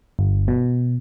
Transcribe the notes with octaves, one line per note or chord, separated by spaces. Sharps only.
G1
B2